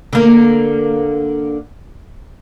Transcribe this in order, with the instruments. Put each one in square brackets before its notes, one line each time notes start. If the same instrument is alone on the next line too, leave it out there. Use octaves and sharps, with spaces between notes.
[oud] D3 A#3